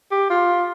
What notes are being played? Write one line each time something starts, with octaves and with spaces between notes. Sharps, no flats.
G4
F4